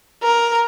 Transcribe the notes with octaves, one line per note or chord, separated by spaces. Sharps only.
A#4